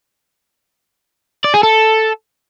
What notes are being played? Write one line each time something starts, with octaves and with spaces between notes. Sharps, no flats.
D5
G#4
A4